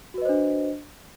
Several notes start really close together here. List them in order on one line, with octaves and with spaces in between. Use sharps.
F#4 B4 D#5 C5 D4